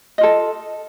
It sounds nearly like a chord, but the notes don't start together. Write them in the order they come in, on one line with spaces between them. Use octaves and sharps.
D#5 F4 A4